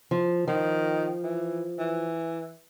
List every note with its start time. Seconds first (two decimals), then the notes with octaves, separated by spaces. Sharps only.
0.11 F3
0.48 D#3 F3
1.23 E3
1.79 E3